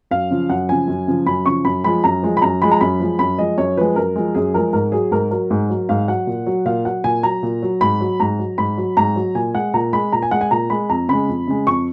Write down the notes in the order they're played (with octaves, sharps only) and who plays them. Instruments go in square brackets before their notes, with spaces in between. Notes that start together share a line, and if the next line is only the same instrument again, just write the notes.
[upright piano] F#2 F5
C#3 F3
F#2 F#5
C#3 F3 G#5
F#2
C#3 F3
F#2 B5
C#3 F3 C#6
F#2 B5
F3 G#3 B5
F#2 A#5
F3 G#3
B5
F#2 A#5
F3 G#3 B5
A#5
F#2 B5
F3 G#3
F#2 B5
F3 G#3 D#5
F#2 C#5
F3 G#3 B4
F#2 A#4
F3 G#3
F#2 G#4
F3 G#3 A#4
G#2 A#4
F#3 G#4
G#2 A#4
F#3 A#4
G#2
F#3
G#2 F5
F#3 F#5
A#2
F#3
A#2 F5
F#3 F#5
A#2 G#5
F#3 A#5
A#2
F#3
G#2 B5
F#3
G#2 A#5
F#3
G#2 B5
F#3
G#2 A#5
F#3
A#2 G#5
G#3 F#5
A#2 A#5
G#3 B5
A#2 A#5
G#5
G#3 F#5
G#5
A#2 A#5
G#3 B5
F2 A#5
C#3 G#3 B5
F2
C#3 G#3
F2 C#6